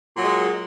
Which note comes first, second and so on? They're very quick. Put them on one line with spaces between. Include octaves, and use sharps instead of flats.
A#2 F#3 G#3